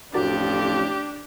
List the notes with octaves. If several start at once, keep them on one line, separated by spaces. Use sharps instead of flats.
A1 F2 A2 D4 F#4 G4 A#4 D5